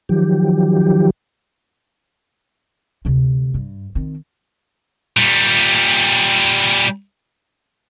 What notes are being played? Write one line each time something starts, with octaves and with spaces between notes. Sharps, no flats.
D#3 F3 F#3 G4
D2 C3
G2
D#3 C4
A#2 G3